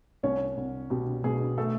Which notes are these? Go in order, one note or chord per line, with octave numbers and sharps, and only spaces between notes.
C2 C#4 C#5
C2
B2 G4
B2 G#4
A3 A4